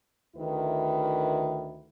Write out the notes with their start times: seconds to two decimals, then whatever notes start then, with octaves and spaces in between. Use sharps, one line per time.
0.35 D2 D#3 E4 B4